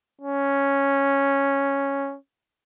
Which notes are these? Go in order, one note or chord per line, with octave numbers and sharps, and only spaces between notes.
C#4